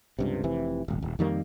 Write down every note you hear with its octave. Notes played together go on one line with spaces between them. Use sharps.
C#2 G2 C3
F1 C3 E3
D#1 G#1
D#1
F2 D#3 G3 A#3